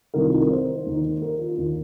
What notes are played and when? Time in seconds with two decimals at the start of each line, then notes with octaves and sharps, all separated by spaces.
0.14 C2 C3 D#3 A#4
0.22 F4
0.32 D#4
0.41 A#4
0.50 C5
0.86 D#2 D#3
1.22 A#4
1.39 F4
1.57 D#2 D#3 D#4